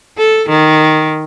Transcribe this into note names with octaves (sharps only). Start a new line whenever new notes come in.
A4
D#3